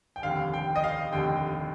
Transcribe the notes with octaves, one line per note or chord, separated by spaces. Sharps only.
G5
F1 D#2 D3 F5
G5
D#5
F5
F1 D#2 D3 G5